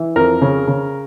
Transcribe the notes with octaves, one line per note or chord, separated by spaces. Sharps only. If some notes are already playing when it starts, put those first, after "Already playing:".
Already playing: E3
F2 A#4
C#3
C#3